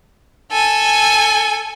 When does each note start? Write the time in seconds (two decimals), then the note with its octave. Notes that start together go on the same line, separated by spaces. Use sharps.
0.52 A4 G#5